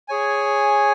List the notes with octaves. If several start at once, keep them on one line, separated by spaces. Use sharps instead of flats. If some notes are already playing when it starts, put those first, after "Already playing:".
G#4 C#5 G#5